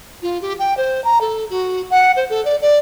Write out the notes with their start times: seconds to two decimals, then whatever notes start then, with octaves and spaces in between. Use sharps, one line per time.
0.22 F4
0.42 G4
0.59 G5
0.77 C5
1.04 A#5
1.21 A4
1.50 F#4
1.90 F#5
2.16 C5
2.30 A4
2.45 D5
2.62 D5